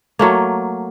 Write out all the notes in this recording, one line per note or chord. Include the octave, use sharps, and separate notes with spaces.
F#3 A3 A#3